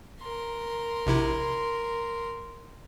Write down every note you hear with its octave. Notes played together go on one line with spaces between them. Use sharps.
A#4 C6
A#1 C3 E4